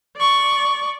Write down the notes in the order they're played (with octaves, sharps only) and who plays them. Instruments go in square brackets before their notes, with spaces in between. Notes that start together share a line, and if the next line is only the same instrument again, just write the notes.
[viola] D5 C#6